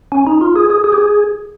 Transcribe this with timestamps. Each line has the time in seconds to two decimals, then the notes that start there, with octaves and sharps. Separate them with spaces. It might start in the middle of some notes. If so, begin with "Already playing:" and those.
0.12 C#4
0.27 D#4
0.41 F4
0.56 G#4
0.70 G#4
0.84 G#4
0.92 G4
0.98 G#4